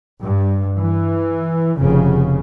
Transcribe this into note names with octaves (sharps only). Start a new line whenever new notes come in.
G2
E3
F1 C#3